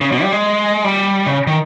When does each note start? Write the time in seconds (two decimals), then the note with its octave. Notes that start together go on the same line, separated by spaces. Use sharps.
0.01 C#3
0.12 B2
0.23 G3
0.32 G#3
0.84 G3
1.26 C#3
1.47 D#3